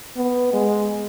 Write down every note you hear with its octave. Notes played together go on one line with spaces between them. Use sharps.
B3
G#3